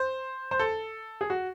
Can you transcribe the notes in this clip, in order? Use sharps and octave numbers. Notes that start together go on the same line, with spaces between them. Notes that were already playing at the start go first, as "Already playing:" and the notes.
Already playing: C5
C5
A4
G#4
F#4